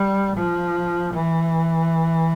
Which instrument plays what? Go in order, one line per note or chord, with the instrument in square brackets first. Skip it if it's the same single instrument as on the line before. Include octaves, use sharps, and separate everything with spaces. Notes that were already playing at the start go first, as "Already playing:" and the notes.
Already playing: [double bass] G3
F3
E3